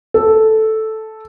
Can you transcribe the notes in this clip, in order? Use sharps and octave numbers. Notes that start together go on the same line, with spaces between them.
A4